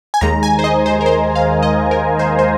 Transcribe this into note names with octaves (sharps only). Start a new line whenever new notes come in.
G#5
D#2 D#3 G#3 A#5
G#5
C5
D#5
C5
A#4
C5
F5
D#5
A#4
C5
C5